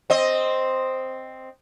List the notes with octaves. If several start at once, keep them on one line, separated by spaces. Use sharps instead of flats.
C4 D#5